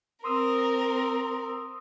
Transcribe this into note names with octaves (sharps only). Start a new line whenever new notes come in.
C4 A#4 C6 D#6 E6